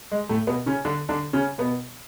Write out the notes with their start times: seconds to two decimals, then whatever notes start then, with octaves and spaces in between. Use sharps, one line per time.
0.12 G#3
0.29 A2 A3
0.47 B2 B3
0.66 C#3 C#4
0.85 D3 D4
1.09 D3 D4
1.33 C#3 C#4
1.58 B2 B3